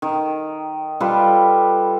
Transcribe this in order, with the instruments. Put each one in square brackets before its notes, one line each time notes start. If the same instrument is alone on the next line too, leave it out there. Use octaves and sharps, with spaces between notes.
[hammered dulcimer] D#3
G3 F4 A4 B4